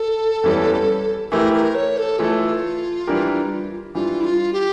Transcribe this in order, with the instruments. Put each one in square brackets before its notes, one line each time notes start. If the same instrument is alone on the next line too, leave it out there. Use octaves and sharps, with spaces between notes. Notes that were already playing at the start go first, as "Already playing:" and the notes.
Already playing: [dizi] A4
[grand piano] E2 E3 G3 C#4
[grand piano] E3 A3 E4 G4 [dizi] A#4
[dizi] A#4
C#5
A4
[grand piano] E3 A3 E4 A4 [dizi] F4
[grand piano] E3 G3 D4 G4 A#4
[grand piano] E3 G3 D4 [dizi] F4
[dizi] E4
F4
G4